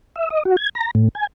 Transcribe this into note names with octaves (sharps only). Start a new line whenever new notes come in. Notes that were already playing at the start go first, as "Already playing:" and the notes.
E5
D#5
F#4
G#6
A#5
A2
G#5